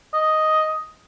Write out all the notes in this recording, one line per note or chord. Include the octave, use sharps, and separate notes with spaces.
D#5